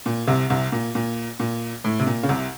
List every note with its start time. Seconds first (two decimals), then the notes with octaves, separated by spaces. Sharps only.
0.06 A#2
0.27 C2 C3
0.50 C2 C3
0.72 A#2
0.95 A#2
1.40 A#2
1.84 A2
1.99 C3
2.07 A#2
2.23 C#3
2.29 C2 C3